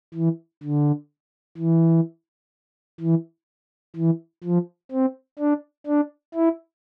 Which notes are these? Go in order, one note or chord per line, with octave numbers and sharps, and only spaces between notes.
E3
D3
E3
E3
E3
F3
C4
D4
D4
E4